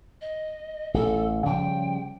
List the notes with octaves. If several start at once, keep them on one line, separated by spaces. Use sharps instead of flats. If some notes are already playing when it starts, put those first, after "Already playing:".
D#5
A1 A4
C#3 F3 G3 G5